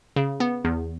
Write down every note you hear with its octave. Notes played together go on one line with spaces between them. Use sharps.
C#3
B3
E2